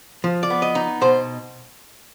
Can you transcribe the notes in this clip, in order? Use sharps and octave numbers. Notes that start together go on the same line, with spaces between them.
F3
D5
B3
D#5
D#4
B2 C5